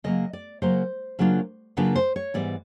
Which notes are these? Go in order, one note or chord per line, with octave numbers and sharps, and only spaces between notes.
C#3 F#3 A#3 D#5
D5
C#3 F#3 A#3 C5
C#3 F#3 A#3 D4 F4
C#3 F#3 A#3 D4 F4 B4
C5
C#5
G#2 E3 G3 B3 D5